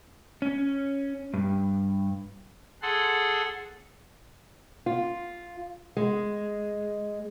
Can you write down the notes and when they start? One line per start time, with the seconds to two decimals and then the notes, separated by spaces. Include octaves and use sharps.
0.42 C#4
1.34 G2
2.82 G#4 A4 F#5 C6
4.86 F4
5.97 G#3